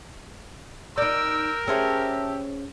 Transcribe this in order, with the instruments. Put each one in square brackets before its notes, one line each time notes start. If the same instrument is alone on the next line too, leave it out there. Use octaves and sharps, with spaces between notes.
[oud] D#4 D5 [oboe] A#4 [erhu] E6 [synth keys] G6 D7
[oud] C#4 G#4 C5 [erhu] G4 [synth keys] E5 A5 E6